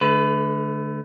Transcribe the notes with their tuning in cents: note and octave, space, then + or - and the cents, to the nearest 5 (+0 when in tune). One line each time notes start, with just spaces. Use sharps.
D3 +5 A3 -35 B4 +20